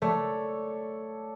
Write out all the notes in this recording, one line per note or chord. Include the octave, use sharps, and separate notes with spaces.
A3 A4 C#5 D5